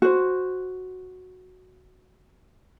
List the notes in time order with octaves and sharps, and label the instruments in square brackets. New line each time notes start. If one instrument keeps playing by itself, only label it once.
[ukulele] F#4 C5